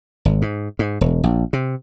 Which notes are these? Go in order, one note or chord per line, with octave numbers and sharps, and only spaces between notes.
G#1
G#2
G#2
E1
A#1
C3